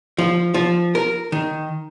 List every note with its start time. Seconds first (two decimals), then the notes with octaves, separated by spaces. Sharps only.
0.18 F3
0.54 F3
0.95 A#4
1.32 D#3